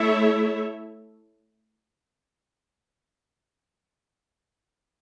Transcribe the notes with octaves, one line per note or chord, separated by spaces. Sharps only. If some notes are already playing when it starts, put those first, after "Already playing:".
Already playing: A3 E4 A4 C#5 E5